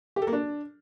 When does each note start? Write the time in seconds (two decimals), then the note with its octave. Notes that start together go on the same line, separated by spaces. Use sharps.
0.16 G4
0.22 A4
0.27 A#3
0.33 D4